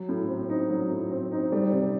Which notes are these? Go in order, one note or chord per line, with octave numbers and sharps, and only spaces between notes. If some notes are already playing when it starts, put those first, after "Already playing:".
Already playing: F#3
A2
C4
D#4
F#3
A2
C4
D#4
G3
C3